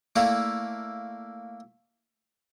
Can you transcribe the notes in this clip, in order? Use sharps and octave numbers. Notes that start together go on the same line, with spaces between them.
A3 A#3 E4 D5 F5